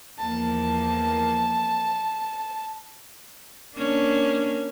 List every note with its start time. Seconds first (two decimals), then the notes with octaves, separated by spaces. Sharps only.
0.19 E2 F3 A#3 A5
3.76 A#3 C#4 D4